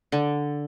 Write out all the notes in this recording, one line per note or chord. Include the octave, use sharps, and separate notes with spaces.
D3